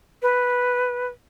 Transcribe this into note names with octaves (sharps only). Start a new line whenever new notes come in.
B4